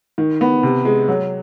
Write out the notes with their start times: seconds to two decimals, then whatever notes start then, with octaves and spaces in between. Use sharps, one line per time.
0.18 D#3
0.41 B3
0.63 C3
0.85 G#3
1.08 F#3